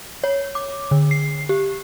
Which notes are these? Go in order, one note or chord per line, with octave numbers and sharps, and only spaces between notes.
C#5
D6
D3
C7
G4